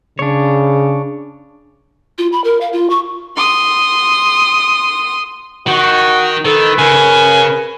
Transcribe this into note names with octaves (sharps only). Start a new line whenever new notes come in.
C#3 D4 C#5
F4
B5
A#4
F5
F4
C#6
C6 D#6
D#3 F#4
D#3 A4 B4
C#3 A#4 G#5